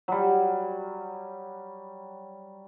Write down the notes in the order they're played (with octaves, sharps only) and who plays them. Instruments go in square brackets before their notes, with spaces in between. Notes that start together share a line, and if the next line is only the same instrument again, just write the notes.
[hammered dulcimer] F#3 G3